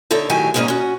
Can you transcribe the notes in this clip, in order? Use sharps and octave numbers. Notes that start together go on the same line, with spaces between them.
D3 D#4 A4 C#5 E5
A2 D#3 F#3 G4 E5 G#5
D#2 G#2 G3 A#3 C#4 D#5
C#4 F#4